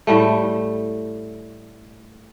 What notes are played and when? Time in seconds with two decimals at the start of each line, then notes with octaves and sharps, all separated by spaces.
0.07 A2 G3 A3